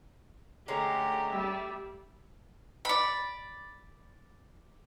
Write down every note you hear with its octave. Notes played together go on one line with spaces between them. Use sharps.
D3 G#3 A3 C#4 G4 A#5
G3 E5
D5 B5